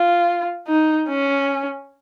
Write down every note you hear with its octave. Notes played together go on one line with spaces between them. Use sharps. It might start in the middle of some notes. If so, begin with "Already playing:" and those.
Already playing: F4
D#4
C#4